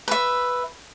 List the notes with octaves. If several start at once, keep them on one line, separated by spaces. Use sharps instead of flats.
B4 E5